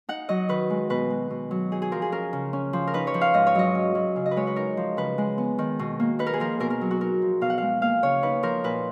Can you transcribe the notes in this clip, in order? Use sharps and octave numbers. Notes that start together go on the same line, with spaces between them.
D#4 F#5
F#3 D#5
D#3 B4
G#3
B2 B4
G#3
B2
F#3
D#4 G#4
G#4
F3 A#4
G#4
C#4 A#4
C#3
C#4
F3
A#4
D#4 B4
C#5
F3
F5
G#2 D#5
C#5
F#3 D#5
C#4
F#3
C#3
D#5
B4
G#3 C#5
B4
D#4 A#4
F3
C#3 B4
G#3
B3
D#3
B2
A#3
D#4 B4
A#4
G#4
F3 A#4
B2 A#4
A#4
F#3
F#4
D#4 A#4
F3
B2 F5
F#5
G#3 F5
A#3 F5
C#3 C#5
D#4 B4
F3 A#4
A#2 B4